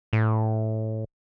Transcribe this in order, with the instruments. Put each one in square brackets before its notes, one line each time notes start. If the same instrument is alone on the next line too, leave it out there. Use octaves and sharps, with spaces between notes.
[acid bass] A2